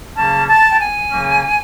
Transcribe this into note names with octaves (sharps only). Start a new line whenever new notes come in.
C#3 F#3 A#3 C#4 A5
A5
G5
G#5
C#3 F#3 A#3 C#4